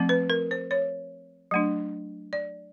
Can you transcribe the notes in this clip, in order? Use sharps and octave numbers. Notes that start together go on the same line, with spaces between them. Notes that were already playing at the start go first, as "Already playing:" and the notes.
Already playing: F3 A3 C4
B4
A#4
C5
C#5
F#3 A3 D4
D5